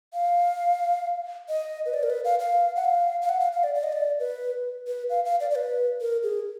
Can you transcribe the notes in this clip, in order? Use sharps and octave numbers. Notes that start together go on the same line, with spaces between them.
F5
D#5
B4
D5
A#4
B4
F5
F5
F#5
F5
F5
F#5
F5
F5
D5
D5
D#5
D5
B4
B4
F5
F5
D5
D5
B4
A#4
G#4